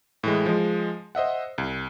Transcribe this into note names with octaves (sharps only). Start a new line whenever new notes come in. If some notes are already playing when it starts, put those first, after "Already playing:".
A2 E3 G#3
F3 G#3
C5 D#5 E5 F#5
C2